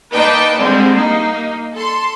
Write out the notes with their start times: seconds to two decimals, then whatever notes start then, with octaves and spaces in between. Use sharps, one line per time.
0.13 A#3 D#4 B4 D5 G5 A5
0.57 D3 G3 G#3 C4 G#4
0.94 A#3 D#4
1.72 A4 C6